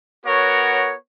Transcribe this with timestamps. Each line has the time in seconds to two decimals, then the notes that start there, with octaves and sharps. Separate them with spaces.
0.24 B3 F#4 A#4 C#5